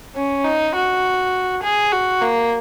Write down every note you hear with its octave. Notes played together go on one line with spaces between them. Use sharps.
C#4
D#4
F#4
G#4
F#4
A#3